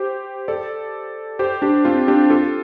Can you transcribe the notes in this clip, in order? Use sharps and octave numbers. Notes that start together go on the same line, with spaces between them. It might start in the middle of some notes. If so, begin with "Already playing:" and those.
Already playing: G4 C5
A4 D5
G4 C5
D4 G4
C4 F4
D4 G4
F4 A4